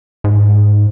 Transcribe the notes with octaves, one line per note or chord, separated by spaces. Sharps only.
G#2